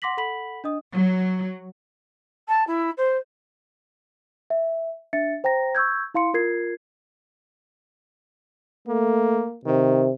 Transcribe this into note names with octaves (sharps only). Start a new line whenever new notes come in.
F#5 C6 D6 A#6 B6 F#7
A4 F#5 B5 B6 F#7
D4 D#5 D#6
F#3
A5
E4
C5
E5
D4 E5 A6 C#7
C5 G5 A#5 A#6
C#6 E6 G6 G#6
E4 F5 C6 C#7
F4 A#4 G#6 C7
A3 A#3
C3 D#3